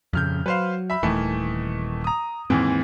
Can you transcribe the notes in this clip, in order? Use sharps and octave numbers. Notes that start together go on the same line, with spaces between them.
D#1 F2 C#3 F6 G6
F#3 B4 C5 F5
E5 B5
D#1 D#3 E3 A3
A#5 D#6
D#2 G#2 E3 C4